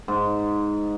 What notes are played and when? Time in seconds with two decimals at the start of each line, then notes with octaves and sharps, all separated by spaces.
0.08 G#2